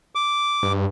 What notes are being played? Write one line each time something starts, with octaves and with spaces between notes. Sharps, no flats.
D6
G2